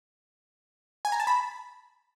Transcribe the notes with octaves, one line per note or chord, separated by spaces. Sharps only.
G#5
A#5
A5
B5